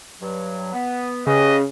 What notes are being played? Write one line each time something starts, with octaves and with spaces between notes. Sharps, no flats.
G2 F#3
B3
C#3 G4 G#4 B4 D#5